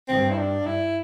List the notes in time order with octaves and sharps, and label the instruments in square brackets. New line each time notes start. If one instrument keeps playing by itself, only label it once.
[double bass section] G2 [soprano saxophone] C4
[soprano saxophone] E4
D4
E4